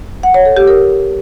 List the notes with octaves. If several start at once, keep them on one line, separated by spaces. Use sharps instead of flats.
F#5
C#5
A4
G4
A#4